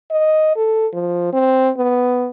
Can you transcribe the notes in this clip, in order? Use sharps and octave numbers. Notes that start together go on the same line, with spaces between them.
D#5
A4
F3
C4
B3